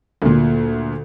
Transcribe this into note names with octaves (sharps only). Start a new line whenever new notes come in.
D2 A#2